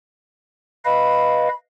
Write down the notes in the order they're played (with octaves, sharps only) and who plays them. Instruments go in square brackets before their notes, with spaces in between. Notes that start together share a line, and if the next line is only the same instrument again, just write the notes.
[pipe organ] B4 D#5 F5 [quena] B5